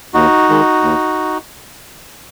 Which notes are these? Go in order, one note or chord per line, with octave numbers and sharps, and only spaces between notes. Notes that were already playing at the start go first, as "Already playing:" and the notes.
D#2 D#4 F#4
D#3 G#3
D#2